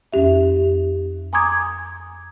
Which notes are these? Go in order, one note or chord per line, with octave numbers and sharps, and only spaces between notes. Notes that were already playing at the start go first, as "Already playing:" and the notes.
F2 C#4 G4 E5
G#5 A#5 C6 D6 D#6 G#6